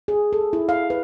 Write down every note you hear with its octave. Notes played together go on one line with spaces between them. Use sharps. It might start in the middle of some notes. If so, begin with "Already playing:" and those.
G#4
A4
E4
F5
B4